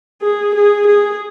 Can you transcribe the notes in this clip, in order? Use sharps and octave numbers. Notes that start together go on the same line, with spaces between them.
G#4
G#4
G#4